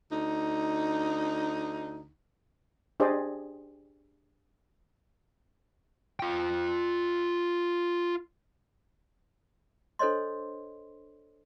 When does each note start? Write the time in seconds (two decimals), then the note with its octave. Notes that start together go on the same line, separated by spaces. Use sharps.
0.12 D2 D#4
3.00 D4 G4 G#4 C5 D5 D#5
6.20 F4 G5
9.99 D4 A4 C5 C#5 D#5 C6